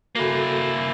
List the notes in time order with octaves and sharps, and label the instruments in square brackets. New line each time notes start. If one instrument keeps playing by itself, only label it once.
[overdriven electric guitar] A#3 E4 [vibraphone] F#4 A4